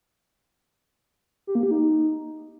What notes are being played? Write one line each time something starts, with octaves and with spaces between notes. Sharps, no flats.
G4
A#3
G4
D#4